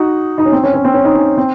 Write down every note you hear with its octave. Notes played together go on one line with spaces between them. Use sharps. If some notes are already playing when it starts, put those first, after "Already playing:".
Already playing: D#4 F#4
D#4
C#4
C4
C#4
C#4
C4
C#4
D#4
C#4
C4